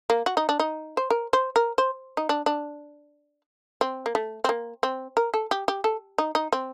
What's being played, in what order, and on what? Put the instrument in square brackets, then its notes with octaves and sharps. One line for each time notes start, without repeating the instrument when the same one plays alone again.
[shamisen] A#3
F#4
D#4
D4
D#4
C5
A#4
C5
A#4
C5
D#4
D4
D4
C4
A#3
A3
C4
A#3
C4
A#4
A4
G4
G4
A4
D#4
D#4
C4